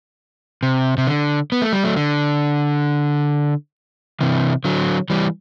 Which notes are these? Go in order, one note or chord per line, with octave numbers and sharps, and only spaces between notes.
C3
C3
D3
B3
A3
G3
F#3 A3
D3
C3 E3
D3 F#3
E3 G3